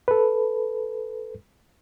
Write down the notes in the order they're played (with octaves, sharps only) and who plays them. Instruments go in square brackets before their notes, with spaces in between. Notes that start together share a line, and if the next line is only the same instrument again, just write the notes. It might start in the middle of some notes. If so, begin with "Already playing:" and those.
[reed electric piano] A4 B4